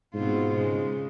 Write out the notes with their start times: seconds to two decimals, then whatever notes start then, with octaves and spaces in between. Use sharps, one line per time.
0.14 G#2 B2 C4 F4
0.55 C#3 G#3